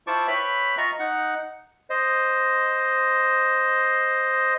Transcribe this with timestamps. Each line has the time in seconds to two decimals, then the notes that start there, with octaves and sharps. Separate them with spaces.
0.07 E4 F4 C5 A5 C#6 D6
0.27 B4 C#5 E5 G5 B5
0.78 F4 D#5 A#5 C#6
0.99 D#4 F#5
1.90 C5 D#5